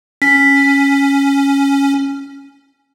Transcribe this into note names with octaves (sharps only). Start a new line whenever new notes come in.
C#4 B6